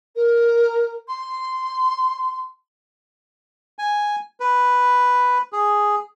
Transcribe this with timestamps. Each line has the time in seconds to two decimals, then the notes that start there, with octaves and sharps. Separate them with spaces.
0.15 A#4
1.08 C6
3.79 G#5
4.40 B4
5.53 G#4